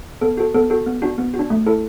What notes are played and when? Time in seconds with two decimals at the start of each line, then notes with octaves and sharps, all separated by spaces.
0.21 B3 A4
0.37 F#4 A4
0.54 B3 A4
0.70 F#4 A4
0.87 B3
1.02 D4 F#4
1.18 B3
1.34 F#4
1.39 D4
1.50 A3
1.66 E4 A4